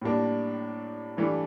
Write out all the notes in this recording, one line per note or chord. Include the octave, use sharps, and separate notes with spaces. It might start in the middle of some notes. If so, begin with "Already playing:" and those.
A2 G3 A#3 D4
G2 E3 A3 D4